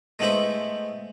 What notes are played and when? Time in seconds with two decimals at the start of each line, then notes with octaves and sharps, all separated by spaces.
0.19 G#3 A3 B3 E4 C5 E5